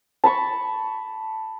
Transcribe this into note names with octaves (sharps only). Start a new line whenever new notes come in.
A5 B5 C#6